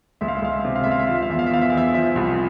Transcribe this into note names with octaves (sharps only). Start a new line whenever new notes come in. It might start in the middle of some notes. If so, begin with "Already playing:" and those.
C#2 E5
F5
E5
C#2 F5
E5
F5
C3 E5
F5
C#2 E5
F5
E5
F3 F5
E5
F5
E2 E5
F5
E5
E2 F5
E5
E2 F5
E5
F3 E5
C2